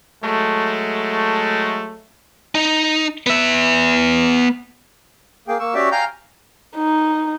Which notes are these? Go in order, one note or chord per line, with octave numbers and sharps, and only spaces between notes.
F#3 G#3 A3
D#4
B3 E5
A#3 G#4 G5
A#3 C#6 E6
C#4 F#4 G4 D5 E5 G5
F5 G5 G#5 A#5 F6 G6
D#4